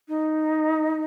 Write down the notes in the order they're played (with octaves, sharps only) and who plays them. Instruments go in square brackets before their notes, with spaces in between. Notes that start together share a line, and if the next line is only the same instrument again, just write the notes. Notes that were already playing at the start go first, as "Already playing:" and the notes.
[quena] D#4